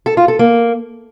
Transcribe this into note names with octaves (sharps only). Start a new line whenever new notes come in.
A4
F4
A4
A#3